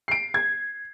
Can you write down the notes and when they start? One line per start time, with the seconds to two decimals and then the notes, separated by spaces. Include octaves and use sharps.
0.08 C7 D7
0.34 G#6